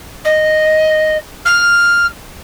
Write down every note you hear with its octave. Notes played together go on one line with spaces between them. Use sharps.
D#5
F6